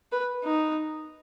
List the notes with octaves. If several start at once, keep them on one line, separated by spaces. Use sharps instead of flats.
B4
D#4